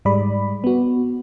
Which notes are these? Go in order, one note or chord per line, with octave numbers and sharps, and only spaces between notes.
G#2 G3 G#3 D5 B5
B3 F#4